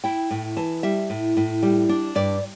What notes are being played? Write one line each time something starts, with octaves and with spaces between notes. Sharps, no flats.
E4 G5
A2
E3 A5
G3 E5
A2
A2
G3
D4
G2 D5